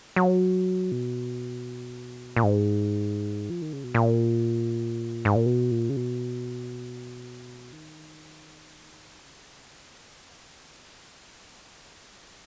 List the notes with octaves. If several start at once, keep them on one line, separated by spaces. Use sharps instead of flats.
F#3
B2
A#2
G#2
F3
D#3
C#3
B2
A#2
G#2
A#2
B2
A#2
C#3
B2
D#3
C#3
B2
C#3